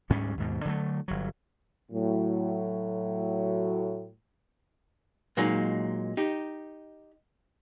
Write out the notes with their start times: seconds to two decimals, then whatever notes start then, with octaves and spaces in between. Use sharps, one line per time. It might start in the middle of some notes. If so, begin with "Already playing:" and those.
0.10 D2 G#2 G3 C#4
0.38 D#2 G#2 B2
0.65 D3 F#3 A3
1.08 G1 F#3
1.92 A2 F#3
5.37 A#2 F#3 G#3 A#3 D#4
6.17 D#4 G4